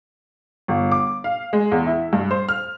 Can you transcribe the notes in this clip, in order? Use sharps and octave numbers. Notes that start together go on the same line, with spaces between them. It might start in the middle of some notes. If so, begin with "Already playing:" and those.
G1
D6
F5
G#3
E2
E4
G2
C5
F6